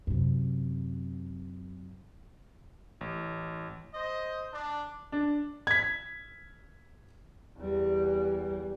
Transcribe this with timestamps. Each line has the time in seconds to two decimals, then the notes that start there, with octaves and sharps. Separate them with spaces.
0.07 F#2 C3
3.01 A1
3.95 C5 D#5
4.52 D4
5.12 D4
5.67 G#6 B6
7.59 E2 G3